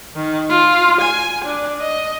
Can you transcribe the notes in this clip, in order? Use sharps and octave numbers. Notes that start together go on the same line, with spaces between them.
D#3
F4
G#5
D4
D#5